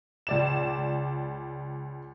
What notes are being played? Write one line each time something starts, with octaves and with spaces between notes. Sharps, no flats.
C#2 D5 E7